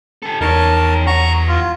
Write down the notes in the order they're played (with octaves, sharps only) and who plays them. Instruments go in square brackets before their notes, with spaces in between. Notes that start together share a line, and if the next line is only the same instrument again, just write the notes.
[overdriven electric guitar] G4 A4
[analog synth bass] E2 [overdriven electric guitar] D#4 C#5 [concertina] A#4 A5
[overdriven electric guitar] G3 F#5 [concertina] A#5 C#6
[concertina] F4